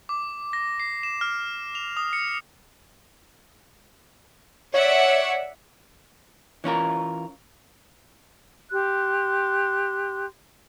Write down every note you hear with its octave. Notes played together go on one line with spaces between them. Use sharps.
D6
A#6
C7
E7
F6
F7
D#6
C#7
C#5 D5 E5 F#5
E3 C#4 F4 A#4
G4 C6 F#6